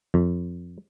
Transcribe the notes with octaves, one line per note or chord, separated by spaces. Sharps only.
F2